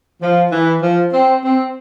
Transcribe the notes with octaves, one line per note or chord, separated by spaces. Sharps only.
F3
E3
F3
C4
C4